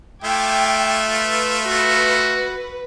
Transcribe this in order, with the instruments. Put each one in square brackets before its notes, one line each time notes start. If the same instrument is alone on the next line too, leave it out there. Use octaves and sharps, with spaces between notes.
[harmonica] A3 F4 E5 [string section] G5 D6 G#6
[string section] B4
[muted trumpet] F#4